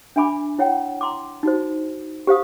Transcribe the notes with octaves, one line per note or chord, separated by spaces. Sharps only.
D4 E5 G#5 B5 D6
E4 C#5 F#5 G5
A#5 C6 D6
D#4 F#4 C5
G4 C5 F5 D#6